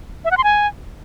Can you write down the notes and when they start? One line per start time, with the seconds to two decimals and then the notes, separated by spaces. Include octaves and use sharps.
0.25 E5
0.31 F#5
0.37 C6
0.44 G#5